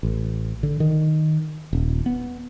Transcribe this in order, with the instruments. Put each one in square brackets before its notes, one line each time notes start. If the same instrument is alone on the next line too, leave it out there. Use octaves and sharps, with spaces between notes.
[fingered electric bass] A1
D3
D#3
D#1
B3